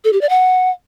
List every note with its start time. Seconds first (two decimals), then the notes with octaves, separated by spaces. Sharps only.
0.04 A4
0.13 G4
0.21 D5
0.30 F#5